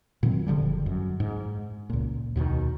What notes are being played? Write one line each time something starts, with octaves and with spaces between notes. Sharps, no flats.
A#2 D#3 F#3 C4
F#1 D3 F3 G3
F#2
G#2
C#2 A#2
D#2 B2 D3 D#3